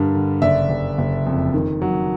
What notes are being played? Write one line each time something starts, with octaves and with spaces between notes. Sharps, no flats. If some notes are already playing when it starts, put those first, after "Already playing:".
Already playing: G2 D3 G3 A#4
D3
F#1 D5 E5
F#1
F#1
F2
D#3
F#3